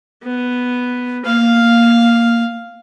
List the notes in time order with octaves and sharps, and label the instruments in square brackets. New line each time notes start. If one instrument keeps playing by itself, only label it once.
[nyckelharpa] B3
[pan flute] A#3 [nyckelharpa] F5